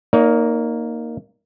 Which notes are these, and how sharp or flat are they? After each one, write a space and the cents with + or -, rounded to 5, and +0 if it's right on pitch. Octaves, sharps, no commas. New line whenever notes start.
A#3 +0 D#4 +0 C#5 +40